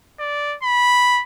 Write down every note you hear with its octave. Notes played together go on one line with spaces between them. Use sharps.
D5
B5